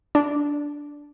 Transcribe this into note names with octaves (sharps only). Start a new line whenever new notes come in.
D4